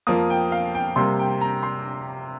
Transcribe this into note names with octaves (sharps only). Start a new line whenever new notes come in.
F2 F3 A#3 D#6
G5
F5
G5
C3 G3 A#3 C6
G5
A#5
C6